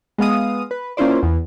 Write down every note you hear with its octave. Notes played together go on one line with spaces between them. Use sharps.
G#3 B3 F5 D#6
B4
A#3 C#4 E4 F4 C5 D5
E2